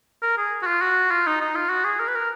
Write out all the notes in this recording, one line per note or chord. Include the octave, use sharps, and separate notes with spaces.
A#4
G#4
F#4
F4
F#4
F4
D#4
D#4
F4
F#4
G#4
A#4
B4
A#4